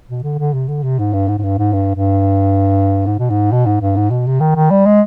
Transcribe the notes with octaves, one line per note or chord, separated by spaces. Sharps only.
B2
D3
D3
C3
D3
C3
G#2
G2
G#2
G#2
G2
G#2
G2
G2
G#2
B2
G#2
B2
G#2
G2
G#2
B2
C3
D#3
D#3
G3
G#3